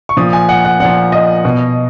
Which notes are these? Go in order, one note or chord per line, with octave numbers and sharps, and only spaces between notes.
C#6
A#2 F3 D#6
G#5
F#5
F#5
A#2 F3 F#5
D#5
B2